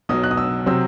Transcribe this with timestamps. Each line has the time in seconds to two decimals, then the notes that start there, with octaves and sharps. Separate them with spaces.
0.09 B1 B2 F#3 D#6
0.24 F#6
0.31 D#6
0.37 E6
0.66 C3 F#3 C4 E6